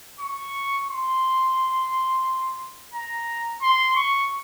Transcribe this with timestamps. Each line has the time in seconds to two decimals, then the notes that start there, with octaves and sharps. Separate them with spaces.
0.20 C#6
0.89 C6
2.94 A#5
3.62 C6
3.96 C#6